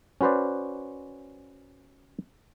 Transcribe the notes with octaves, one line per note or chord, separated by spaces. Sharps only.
C#4 F#4 B4 C5 D5